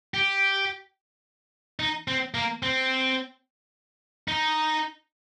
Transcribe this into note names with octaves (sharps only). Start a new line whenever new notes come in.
G4
D#4
C4
A#3
C4
D#4